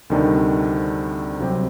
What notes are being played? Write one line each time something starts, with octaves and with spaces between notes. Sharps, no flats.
D2 C3 D#3 G3 D4
C2 C3 F#3 C4 G4